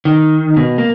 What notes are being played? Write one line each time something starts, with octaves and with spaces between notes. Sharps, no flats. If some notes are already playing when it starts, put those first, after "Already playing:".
D#3
B2
A#3